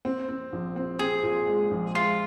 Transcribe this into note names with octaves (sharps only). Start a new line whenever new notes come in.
C4
C4
A#1
C4
C4 G#4
A#2
G#3
A#1
G#3 F4